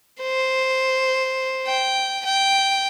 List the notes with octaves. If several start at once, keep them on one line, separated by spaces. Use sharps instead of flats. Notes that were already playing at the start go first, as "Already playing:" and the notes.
C5
G5
G5